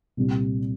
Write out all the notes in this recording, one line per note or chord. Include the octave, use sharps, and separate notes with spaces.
C2 A#2 G3